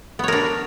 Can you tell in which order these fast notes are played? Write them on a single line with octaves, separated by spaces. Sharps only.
B3 C#5 A#4 D4